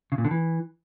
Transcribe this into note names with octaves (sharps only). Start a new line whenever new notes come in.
C#3
A#2
D3
E3